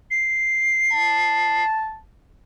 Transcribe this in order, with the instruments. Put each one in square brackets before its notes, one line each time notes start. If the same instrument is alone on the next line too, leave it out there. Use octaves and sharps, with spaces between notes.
[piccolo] C7
[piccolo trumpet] A5